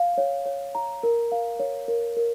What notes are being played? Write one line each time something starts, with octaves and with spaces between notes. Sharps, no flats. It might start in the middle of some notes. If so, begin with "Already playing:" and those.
Already playing: F5
C#5
C#5
A#5
A#4
F5
C#5
A#4
A#4